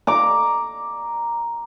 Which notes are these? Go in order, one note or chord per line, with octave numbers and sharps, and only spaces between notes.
A#5 D6